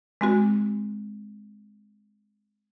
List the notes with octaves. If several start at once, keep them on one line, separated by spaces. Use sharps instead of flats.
G#3 C4 F#4